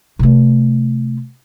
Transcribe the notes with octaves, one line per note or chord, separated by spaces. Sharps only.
C3 A3